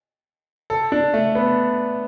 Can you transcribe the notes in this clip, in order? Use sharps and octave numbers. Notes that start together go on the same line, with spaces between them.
A4
D4
A3
B3